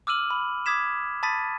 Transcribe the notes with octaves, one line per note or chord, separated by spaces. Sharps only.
D6 E6 F6 D#7 F#7
B5
D6 D#6 G#6 B6 E7
A5 B5 D#6 A6 B6 D#7